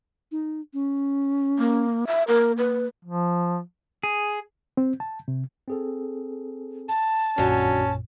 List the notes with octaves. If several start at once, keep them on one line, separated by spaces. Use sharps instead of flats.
D#4
C#4
A#3
E5
A#3 A#4
B4
F3
G#4
C4
A5
C3
C4 G#4 A4
A5
A#1 F#2 A#2 D3 F#3 C#4